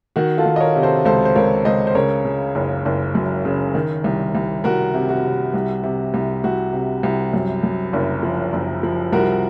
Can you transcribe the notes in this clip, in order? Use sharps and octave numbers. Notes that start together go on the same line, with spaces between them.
D#3 F#4
F4 A4
D#3
D#5
A#4 C#5
C3
A4 C5
C#2 A4 C5
C5
C#2 A#4 C#5
C#2 C5 D#5
C5
C#3 A#4 C#5
C#3
F#1
F#1
F#2
C#3
D#3
C2
C2
C2 F#4 A#4
C3
F#4
C3
C2
C3
C2
C2 F#4
C3
C2
F#2
F#2
F#1
F3
F#1
F3
C2 F#4 A#4